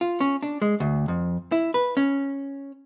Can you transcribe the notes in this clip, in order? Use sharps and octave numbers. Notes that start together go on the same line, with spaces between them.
F4
C#4
D4
G#3
D2
F2
E4
B4
C#4